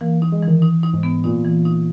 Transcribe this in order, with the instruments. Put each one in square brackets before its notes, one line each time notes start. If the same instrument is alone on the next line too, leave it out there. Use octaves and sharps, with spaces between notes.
[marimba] E3 [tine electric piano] A#3
[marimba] D#4
[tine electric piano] G#3
[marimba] E3
[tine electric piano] D#3
[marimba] D#4
D#4
[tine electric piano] G#2
[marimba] B3
[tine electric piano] A#2 [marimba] D#4
[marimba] E3
D#4